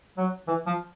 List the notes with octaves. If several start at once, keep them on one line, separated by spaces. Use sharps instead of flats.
F#3
E3
F3